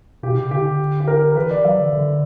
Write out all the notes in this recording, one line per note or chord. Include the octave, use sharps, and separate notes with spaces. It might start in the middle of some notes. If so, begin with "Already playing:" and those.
B2 G4
C#3
D3 G4
G4
A#4
A#4
E3 B4
D5
F#3 E5
D3
D3